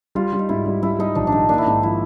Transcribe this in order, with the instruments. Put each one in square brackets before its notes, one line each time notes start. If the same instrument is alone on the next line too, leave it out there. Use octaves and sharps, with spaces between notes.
[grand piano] G3 [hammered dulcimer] F4
[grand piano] G3
[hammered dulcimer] D#4
[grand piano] G#2 [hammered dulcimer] E4
[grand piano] G3
[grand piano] G3 [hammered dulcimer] E4
[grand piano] G3 [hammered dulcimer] D#4
[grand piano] A#1 [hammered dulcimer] D4
[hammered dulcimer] D4
[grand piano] D#3 [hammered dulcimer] D#4
[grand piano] A#3 [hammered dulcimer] D4
[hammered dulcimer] E4
[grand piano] G#2 [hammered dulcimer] D#4
[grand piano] F3 [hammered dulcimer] E4